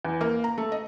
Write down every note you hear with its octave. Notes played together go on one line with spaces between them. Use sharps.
E2
A#3
A#5
A3
D#5